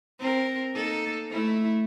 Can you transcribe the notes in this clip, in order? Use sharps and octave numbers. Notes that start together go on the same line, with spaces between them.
C4 A#4
A#3 D#4 A4
A3 E4